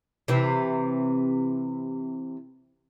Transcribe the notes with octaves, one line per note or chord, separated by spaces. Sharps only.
C3 E3